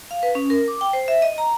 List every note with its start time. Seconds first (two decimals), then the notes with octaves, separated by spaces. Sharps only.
0.11 F5
0.23 B4
0.35 C#4
0.50 A#4
0.68 D6
0.81 G5
0.93 C5
1.08 E5
1.22 D#5
1.38 A#5